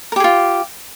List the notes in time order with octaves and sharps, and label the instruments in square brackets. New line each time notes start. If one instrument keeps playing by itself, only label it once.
[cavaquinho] A#4
G4
G#4
F4